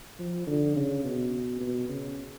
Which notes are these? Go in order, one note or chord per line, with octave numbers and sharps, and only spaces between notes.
F3
D3
C#3
B2
B2
C#3